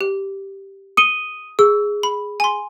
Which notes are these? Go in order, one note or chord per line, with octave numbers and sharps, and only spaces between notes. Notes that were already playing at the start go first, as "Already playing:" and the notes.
G4
D#6 C#7 D#7 G7
G#4 E6
B5
G#5 C6